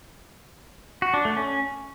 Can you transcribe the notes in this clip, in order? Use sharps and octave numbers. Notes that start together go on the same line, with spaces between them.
F#4
D4
A3
C#4